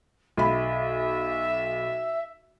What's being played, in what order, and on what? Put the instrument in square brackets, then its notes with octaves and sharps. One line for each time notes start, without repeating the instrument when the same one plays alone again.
[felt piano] B1 B5 [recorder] E5